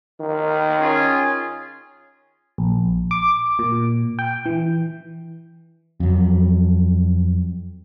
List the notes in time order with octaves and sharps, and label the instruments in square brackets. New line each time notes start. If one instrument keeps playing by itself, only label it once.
[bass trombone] D#3
[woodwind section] C#4 F4 G#4
[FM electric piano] A#1
D6
A#2
G5
E3
[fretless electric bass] F2 F#3